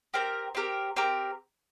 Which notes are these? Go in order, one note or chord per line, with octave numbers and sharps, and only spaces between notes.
C4 G4 A#4
C4 G4 A#4
C4 G4 A#4